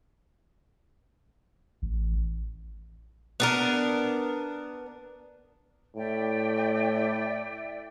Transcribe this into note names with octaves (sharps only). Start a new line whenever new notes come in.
A1
B3 D4 A#4
A2 D5 E5 G5